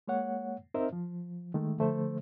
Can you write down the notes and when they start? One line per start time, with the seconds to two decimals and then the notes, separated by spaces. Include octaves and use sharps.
0.08 G#3 A#3 C#5 F#5
0.74 C4 D#4 A#4 C5 D#5 E5
0.93 F3
1.54 D#3 G#3 A3
1.78 D3 F3 A3 C5